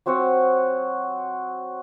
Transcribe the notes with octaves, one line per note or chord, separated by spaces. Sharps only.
F#3 C4 F#4 C#5